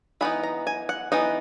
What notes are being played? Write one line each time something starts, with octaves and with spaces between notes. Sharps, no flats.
E3 B3 D#4 B5
A#5
G#5
F#5
E3 B3 D#4